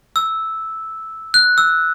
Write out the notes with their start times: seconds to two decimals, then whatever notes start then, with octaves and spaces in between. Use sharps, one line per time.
0.16 E6
1.34 F#6
1.58 E6